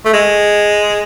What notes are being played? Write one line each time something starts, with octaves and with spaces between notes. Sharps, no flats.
A3
G#3